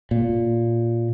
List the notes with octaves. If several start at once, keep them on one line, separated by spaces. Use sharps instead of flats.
A#2